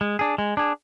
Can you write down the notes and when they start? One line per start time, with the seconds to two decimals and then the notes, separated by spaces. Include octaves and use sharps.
0.01 G#3
0.19 D4 G#4
0.38 G#3
0.57 D4 G#4